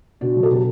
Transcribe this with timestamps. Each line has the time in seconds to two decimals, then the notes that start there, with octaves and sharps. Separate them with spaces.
0.21 B2 D4 F#4
0.36 F#3
0.43 A4
0.51 B2 G4